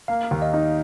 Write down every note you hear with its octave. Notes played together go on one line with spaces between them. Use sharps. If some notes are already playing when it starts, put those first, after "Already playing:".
A#3 F5
D#2
D#5
D#4